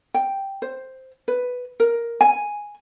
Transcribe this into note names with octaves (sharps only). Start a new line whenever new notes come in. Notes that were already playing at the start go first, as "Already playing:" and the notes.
G5
C5
B4
A#4
G#5